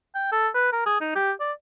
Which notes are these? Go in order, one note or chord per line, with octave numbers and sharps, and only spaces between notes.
G5
A4
B4
A#4
G#4
D#4
G4
D5